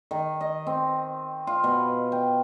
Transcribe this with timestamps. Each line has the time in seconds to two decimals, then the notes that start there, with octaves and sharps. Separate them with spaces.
0.11 D#3
0.41 D#5
0.67 C4
1.47 F4
1.64 B2
2.12 G5